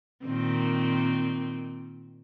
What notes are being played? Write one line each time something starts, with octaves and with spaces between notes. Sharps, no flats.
A#2 D#3 C4